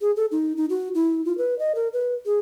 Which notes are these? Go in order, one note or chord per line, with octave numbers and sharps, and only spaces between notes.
G#4
A4
D#4
D#4
F#4
E4
F4
B4
D#5
A#4
B4
G#4